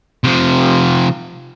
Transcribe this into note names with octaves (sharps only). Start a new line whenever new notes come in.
C3 F3